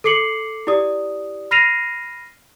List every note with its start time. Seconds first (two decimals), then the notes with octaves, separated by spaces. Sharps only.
0.04 A4 D6 C7 C#7 F#7
0.67 E4 G4 D5 D#6
1.51 B5 F6 A#6 C7 D#7 F7